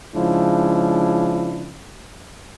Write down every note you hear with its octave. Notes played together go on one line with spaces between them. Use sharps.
C#3 F3 G#3 D4 E4